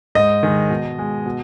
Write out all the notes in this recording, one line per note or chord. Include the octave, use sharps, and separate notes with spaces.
G#2 D#5
D#3 G#3
B2
G#3
B2